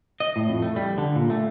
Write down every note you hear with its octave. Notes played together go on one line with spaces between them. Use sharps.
D#5
A2
F2
A3
G3
D3
A#2
A3